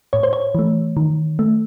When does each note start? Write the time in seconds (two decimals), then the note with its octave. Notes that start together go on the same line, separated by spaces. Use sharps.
0.13 A2 C#5
0.23 C5
0.33 C#5
0.55 E3 A3
0.97 D#3
1.39 A3